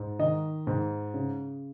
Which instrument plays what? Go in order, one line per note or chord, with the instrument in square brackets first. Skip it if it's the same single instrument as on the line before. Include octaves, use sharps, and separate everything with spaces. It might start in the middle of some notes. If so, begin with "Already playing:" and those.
Already playing: [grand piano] G#2
D#3 D#5
G#2
C#3